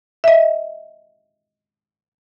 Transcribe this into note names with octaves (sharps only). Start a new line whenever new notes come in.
D#5 E5